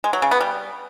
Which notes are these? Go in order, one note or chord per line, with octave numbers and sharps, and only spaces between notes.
G#3
F#3
C#3
B3
G3